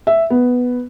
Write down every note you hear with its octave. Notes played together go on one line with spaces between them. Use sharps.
E5
B3